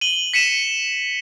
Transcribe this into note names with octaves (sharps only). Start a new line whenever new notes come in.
D#7 F#7 G7
B6 C#7 D#7 E7